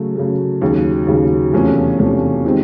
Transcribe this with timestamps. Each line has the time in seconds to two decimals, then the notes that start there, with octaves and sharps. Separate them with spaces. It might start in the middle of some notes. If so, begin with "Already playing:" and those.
Already playing: C#3 F#3 A3
0.16 C#3 F#3 A3
0.62 D#2 C#3 F#3
1.07 D#2 C#3 F#3
1.53 E2 C3 F3 A3 C#4
1.98 E2 C3 F3 A3 C#4
2.45 C3 D#3 G#3 C4